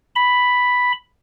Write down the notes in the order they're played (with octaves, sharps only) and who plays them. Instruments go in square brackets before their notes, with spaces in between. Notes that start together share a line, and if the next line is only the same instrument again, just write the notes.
[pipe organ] B5